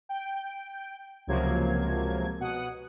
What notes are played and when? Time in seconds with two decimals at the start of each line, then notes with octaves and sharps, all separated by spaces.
0.09 G5
1.27 C#2 C3 F3 F#3 A#3 G#6
2.39 B2 F#5 D#6